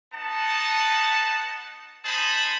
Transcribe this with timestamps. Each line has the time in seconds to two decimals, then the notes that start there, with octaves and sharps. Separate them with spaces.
0.13 B3 D#4 F#5 A5
2.05 G#3 D#4 G#4 C5 A5 B5